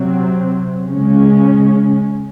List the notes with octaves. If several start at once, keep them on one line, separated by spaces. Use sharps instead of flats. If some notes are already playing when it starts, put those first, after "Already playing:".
Already playing: C3 F#3 C4
C#3 G#3 C#4